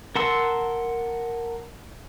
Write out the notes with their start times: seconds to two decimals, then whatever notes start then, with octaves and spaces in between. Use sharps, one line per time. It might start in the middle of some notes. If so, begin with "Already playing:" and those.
0.16 A#4 F#5 A5 C6 E6